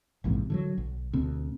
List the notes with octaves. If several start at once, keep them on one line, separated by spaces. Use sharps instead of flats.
A#1 E2 G#2 C3
D3 D#3 F#3
B1
D2 B2 C4